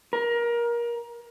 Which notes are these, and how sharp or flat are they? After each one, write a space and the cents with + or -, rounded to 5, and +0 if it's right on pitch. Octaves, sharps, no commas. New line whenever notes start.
A#4 +25